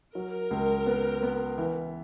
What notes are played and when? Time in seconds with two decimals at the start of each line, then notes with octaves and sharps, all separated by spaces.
0.15 F#3 A#4
0.51 C#2
0.86 B3
1.23 B3
1.58 E3